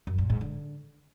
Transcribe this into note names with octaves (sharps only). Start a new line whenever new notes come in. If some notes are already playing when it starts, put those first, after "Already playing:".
F#2
A#2
G#2
D3